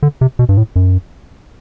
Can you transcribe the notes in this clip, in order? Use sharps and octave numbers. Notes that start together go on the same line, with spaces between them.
D3
C3
B2
G2
A2
F#2